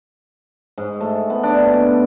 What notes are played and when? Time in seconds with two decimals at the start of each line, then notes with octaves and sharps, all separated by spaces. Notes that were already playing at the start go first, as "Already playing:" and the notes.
0.78 G#2
1.00 A3
1.30 B3
1.43 D4
1.63 B2